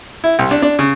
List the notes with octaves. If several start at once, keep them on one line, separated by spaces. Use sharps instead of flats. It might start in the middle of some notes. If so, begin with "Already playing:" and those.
E4
C2
D4
D4
C#3